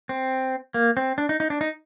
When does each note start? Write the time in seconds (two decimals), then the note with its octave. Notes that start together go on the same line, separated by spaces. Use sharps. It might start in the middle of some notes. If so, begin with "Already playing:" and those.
0.09 C4
0.74 A#3
0.97 C4
1.18 D4
1.29 D#4
1.40 D#4
1.50 D4
1.61 D#4